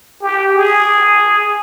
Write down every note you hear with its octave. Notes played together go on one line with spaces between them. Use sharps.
G4
G#4